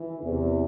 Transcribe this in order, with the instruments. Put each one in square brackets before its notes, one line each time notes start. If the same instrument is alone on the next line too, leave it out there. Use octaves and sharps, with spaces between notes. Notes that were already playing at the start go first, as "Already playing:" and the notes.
Already playing: [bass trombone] E3
[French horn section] E2 [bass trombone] C3